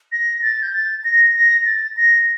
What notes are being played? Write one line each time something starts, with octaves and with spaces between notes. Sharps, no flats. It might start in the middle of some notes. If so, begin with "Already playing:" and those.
A#6
A6
G6
A6
A#6
A#6
A6
A#6